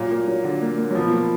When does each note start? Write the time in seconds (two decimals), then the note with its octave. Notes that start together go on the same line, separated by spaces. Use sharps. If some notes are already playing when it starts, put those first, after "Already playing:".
Already playing: A#2 F#3
0.11 A#3
0.27 F#3
0.44 D3
0.62 A#3
0.78 A#3
0.91 F#3
0.95 B2 F3
1.12 A#3